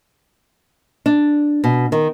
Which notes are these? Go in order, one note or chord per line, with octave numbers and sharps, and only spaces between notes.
D4
B2
D#3